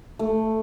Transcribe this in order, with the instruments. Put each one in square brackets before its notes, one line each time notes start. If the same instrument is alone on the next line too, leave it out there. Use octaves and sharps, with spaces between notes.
[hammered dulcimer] A3